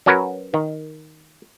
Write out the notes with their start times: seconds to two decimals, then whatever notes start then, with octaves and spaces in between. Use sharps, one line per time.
0.06 F#3 C#4 F#4 A#4 B4
0.54 D#3